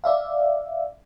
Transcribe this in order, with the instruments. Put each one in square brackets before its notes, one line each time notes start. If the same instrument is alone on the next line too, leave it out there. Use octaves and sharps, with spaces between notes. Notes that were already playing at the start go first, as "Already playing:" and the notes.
[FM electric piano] D5 E5 F5